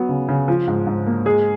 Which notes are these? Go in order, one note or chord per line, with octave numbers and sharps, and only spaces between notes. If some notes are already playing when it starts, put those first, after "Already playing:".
Already playing: F#3 B3
C#3
C#3
F3
G#2
G#2
A#3
G#3 G#4